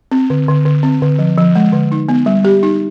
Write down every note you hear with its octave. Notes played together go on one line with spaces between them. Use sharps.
C4
D3
D3
D3
C4
D3
F3
F3
G#3
D3
D#4
B3
G3
G4
D#4